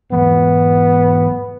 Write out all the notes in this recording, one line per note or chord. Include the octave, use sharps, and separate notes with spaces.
G#2 E3 F#3 B3